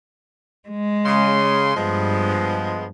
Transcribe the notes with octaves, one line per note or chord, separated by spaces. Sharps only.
G#3
C#3 C6
G2 F3 G#3 B3